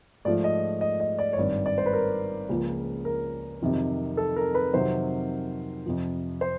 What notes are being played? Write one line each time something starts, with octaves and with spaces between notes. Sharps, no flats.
G#2 F3 A3 D5
D#5
D#5
D#5
D5
C#5
G#1 G2 D#3 D5
D5
C5
B4
A#4
C#2 C#3 F3 A#3
A#4
F2 C3 D#3 F#3
A4
A#4
B4
F2 C3 D#3 F#3 C5
F2 C3 F3
C5